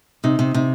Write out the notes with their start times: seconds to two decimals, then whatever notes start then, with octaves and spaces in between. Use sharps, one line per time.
0.24 C3 D#4
0.39 C3
0.54 C3 D#4